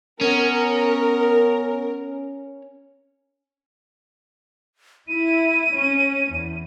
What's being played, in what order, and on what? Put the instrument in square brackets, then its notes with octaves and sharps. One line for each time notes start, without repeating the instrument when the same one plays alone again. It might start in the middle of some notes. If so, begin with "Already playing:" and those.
[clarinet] B3 [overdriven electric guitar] C#4 [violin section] A#4
[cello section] E4 [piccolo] D#7
[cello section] C#4
E2